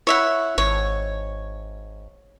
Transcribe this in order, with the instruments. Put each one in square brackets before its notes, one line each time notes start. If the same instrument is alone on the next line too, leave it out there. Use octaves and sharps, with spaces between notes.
[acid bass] E4 [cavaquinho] C#5 E5 F#5
[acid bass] G#1 [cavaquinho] C#5